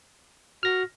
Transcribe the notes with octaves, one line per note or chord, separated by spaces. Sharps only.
F#4 F6 A#6